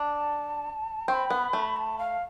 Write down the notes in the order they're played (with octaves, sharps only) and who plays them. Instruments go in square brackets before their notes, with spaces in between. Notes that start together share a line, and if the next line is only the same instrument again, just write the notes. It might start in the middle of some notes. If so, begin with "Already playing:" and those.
Already playing: [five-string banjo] D4 [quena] A5
[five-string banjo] C4 [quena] C#6
[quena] B5
[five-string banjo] B3
A3
[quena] A5
F5